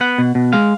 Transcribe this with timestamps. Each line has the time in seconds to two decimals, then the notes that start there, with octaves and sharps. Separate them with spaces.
0.01 B3 F#5
0.18 B2
0.35 B2
0.53 G#3 F5